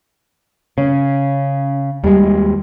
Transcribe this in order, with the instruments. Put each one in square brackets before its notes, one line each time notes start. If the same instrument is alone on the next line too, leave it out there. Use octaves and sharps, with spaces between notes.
[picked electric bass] C#3 [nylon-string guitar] C#4
[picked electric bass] D#2 G#3 [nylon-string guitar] G3